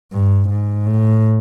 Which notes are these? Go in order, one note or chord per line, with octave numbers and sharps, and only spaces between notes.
G2
G#2
A2